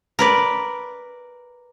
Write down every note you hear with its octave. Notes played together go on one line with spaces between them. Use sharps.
A#4 B4 D5